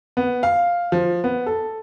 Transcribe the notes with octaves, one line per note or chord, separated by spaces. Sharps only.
B3
F5
F3
B3
A4